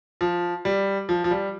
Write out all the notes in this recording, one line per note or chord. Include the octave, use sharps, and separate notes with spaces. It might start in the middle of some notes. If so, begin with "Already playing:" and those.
F3
G3
F3
F3
G3